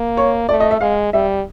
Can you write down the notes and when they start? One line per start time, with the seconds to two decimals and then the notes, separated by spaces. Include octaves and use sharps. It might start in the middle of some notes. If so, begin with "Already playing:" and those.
Already playing: A#3
0.17 C#5
0.49 A3 D5
0.60 D#5
0.71 E5
0.81 G#3 F5
1.13 G3 E5